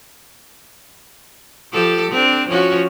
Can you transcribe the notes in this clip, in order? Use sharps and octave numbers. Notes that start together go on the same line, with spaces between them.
F3 G4 A4
C4 D4
F3 C#4 F#4